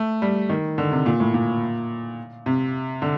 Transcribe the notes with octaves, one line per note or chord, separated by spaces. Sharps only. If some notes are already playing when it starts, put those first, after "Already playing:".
Already playing: A3
G3
D#3
D3
C3
A#2
A2
A#2
C3
D3